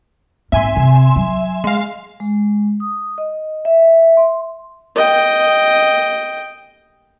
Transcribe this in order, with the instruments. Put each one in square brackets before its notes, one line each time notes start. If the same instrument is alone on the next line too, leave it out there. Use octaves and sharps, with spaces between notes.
[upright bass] G#1 A#2 [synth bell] E5 G#5 C6
[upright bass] C3
F#3
[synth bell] G#3 F5
[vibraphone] G#3
D#6
D#5
E5
E5
C6
[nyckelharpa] D#5 G5